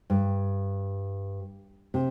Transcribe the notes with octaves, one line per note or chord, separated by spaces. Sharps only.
G2
C3